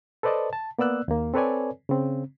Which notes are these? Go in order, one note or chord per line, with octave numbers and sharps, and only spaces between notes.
A4 B4 C5 D5 D#5 A5
A5
A#3 B3 D5 E6 F#6
D#2 A#3
C4 A4 B4 C#5 D5 G#5
C#3 C4